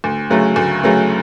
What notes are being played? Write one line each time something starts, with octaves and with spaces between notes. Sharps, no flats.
D2
C#3 F#3 A3
D2
C#3 F#3 A3